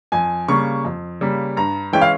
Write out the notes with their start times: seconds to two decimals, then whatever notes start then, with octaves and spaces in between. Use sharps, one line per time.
0.12 F2 G#5
0.48 C#3 G3 A#3 C#6
0.85 F2
1.21 C#3 G3 A#3
1.57 G2 A#5
1.93 E3 G#3 C#4 E4 G5
2.02 F5